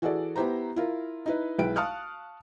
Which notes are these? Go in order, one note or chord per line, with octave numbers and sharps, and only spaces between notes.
E3 F#4 G#4 A4 D5
B3 E4 G4 C5 A#5
E4 F4 A#4
D#4 E4 B4
B1 G#3 E4 B4 G5 D7
F5 A5 C#6 D#6 F6 F#6